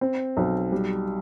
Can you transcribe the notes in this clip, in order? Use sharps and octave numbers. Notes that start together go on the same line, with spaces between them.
C4
B1
G3